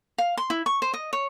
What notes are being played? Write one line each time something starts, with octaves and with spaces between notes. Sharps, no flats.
F5
C6
E4
C#6
C5
D#5
C#5